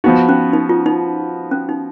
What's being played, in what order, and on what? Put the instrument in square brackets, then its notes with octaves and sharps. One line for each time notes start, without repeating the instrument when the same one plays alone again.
[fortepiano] F3 B3 F#4 [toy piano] D#4
[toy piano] C#4
D#4
F4
D#4
C#4
D#4